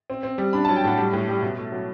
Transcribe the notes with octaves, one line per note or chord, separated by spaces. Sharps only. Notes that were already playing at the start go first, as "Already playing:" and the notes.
C4
C4
G3
D4 B5
F#3 A5
G5
A2 F#5
G3
A2
G3
B2
A3
F#3